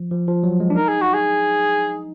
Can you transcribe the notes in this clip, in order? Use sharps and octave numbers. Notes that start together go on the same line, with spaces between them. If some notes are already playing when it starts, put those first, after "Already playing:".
Already playing: F3
F3
F3
F#3
G#3
D4
D#4 A#4
G#4
F#4
G#4